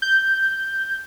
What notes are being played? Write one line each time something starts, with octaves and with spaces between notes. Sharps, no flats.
G6